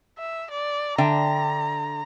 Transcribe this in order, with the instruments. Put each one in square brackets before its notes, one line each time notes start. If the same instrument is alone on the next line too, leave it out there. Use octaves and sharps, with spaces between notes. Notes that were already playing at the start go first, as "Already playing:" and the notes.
[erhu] E5
D5
[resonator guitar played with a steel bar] D3 E5 G5 [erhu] A#5